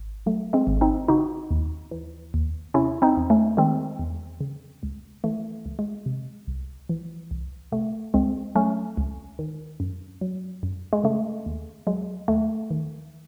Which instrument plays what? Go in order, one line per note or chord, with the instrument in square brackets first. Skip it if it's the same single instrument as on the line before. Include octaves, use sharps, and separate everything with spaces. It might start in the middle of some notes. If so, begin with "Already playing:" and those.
Already playing: [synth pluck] G#1
F#3 A3
G#3 C4
G#1
C4 D#4
C#3 D#4 F#4
D#2
E3
D#2
C3 C#4 E4
C4 D#4
E2
A3 C#4
D#3 G#3 C4
E2
C#3
C#2
E3 A3
C#2
G#3
C3
C2
E3
C2
C3 A3
C#2 G#3 C4
F#3 A3 C#4
C#2
D#3
F#2
F#3
F#2
G#3
C#3 A3
D#2
F#3 G#3
D#2 A3
D#3